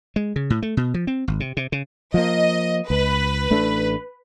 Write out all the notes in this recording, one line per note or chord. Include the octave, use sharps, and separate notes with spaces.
G#3
C#3
A2
A3
B2
F3
C4
G#1
C3
C3
C#3
F3 A#3 D#5
C#2 B4
A1 A3 D4